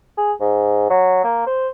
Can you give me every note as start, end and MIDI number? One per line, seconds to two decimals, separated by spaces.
0.18 0.33 68
0.41 0.89 44
0.90 1.23 54
1.24 1.46 58
1.47 1.68 72